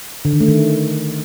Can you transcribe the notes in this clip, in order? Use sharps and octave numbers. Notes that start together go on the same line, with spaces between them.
D3
D#3
A3
D#3